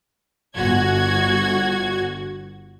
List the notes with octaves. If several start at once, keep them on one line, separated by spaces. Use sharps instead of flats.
G1 F#4 G#6